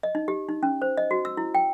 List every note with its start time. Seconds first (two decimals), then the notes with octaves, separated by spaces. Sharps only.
0.03 D#5
0.15 D#4
0.28 G4
0.49 D#4
0.63 C#4
0.82 C5
0.97 D#5
1.11 F#4
1.25 E6
1.37 E4
1.55 G5